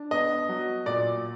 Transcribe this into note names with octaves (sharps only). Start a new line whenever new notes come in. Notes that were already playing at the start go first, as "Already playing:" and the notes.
Already playing: D4
B3 D#5
F#3
A#2 D5